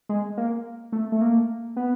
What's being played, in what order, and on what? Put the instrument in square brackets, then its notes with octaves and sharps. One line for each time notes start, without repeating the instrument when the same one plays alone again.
[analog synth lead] G#3
A#3
A3
A3
A#3
B3